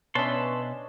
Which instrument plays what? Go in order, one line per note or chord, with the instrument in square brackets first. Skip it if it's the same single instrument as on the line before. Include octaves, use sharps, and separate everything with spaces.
[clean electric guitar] B2 E5 [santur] C#4 D4 D#5 [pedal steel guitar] B4 A5 C6